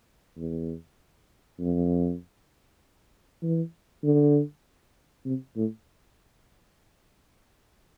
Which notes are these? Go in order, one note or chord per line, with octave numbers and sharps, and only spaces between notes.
E2
F2
E3
D3
C3
A2